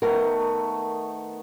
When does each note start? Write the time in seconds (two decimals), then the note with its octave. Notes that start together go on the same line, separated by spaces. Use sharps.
0.02 D#3 A3 B3 A#4